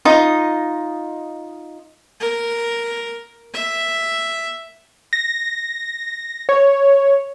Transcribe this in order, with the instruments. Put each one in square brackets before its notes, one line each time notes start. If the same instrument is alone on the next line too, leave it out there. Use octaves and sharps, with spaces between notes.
[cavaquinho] D#4 F4 D#5
[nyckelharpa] A#4
E5
[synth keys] A#6
C#5